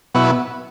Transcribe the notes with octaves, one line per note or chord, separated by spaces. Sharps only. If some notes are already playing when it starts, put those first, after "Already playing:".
B2 F#3 B3 E4